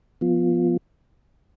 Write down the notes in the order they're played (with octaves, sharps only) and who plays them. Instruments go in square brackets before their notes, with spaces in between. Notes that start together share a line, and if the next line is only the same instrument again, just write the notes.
[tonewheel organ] F3 B3 F4